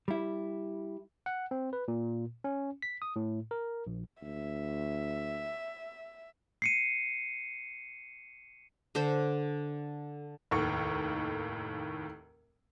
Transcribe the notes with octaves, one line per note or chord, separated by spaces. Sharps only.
G3 E4
F#5
C4
B4
A#2
C#4
B6
D#6
A2
A#4
A#1
D2 E5
C7 C#7 D#7
D3 A4 C5
F1 D#2 A2 C#6